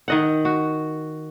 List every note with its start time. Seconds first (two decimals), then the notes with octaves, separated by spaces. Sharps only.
0.08 D#3 D#5 F#5
0.45 F#4